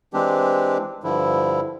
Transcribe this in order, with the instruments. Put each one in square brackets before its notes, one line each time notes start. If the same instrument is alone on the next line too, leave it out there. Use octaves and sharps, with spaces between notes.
[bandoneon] E3 G#3 C4 D4 G4
G2 D3 F3 E4